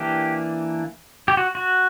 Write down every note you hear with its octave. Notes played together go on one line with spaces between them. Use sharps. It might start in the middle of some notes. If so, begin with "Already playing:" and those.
Already playing: E3 A#3 D4 G4
G4
F#4
F#4